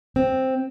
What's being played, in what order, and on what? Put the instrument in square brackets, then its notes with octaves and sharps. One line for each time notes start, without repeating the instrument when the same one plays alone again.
[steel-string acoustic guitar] C4